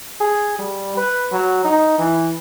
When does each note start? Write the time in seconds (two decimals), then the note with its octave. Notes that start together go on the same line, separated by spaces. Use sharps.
0.20 G#4
0.59 G3
0.97 B4
1.32 F#3
1.64 D#4
1.98 E3